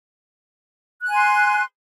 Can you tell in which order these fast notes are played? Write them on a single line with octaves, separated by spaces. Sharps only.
F#6 G#5 C6